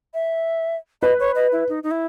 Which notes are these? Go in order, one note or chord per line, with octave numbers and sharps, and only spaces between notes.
E5
B4 D#5
C#5
D#5
E4
D#4
D#4
E4